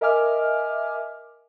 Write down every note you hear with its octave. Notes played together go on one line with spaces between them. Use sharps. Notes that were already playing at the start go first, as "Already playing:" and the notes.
A#4 D#5 E5 G#5 D6 F6